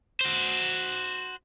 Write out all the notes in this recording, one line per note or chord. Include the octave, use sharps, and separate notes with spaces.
F#4 C5